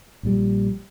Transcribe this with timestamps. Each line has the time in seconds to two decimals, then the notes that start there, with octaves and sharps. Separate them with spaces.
0.23 A#1 A#2 F3 G3